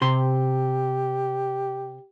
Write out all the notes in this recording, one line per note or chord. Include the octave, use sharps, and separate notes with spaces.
C3 G4 C6